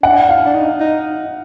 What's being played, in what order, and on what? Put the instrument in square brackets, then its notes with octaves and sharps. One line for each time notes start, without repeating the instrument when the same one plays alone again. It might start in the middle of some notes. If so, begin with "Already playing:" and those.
[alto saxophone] D4 [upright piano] F#5
[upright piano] F5
[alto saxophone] D4
D#4
D#4